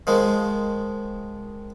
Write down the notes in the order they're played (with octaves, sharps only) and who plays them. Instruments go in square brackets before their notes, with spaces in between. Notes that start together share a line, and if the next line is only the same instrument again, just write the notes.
[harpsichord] D#3 F3 G#3